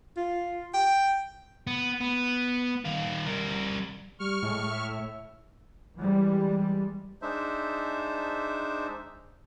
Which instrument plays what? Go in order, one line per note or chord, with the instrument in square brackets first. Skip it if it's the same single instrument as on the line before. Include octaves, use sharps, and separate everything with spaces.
[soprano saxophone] F4
G5
[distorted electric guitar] B3
B3
D#3 F4
G3 A#4
[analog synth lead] G3 [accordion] C#6 F6
[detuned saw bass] A2 [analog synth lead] G#3
[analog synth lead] E5
[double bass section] E3 G3 G#3
[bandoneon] G#3 D4 D#4 C5 E5